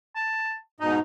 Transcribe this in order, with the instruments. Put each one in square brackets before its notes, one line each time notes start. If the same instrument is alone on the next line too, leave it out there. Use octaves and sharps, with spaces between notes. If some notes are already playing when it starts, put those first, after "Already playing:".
[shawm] A5
[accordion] G#2 B2 D#4 [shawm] D#5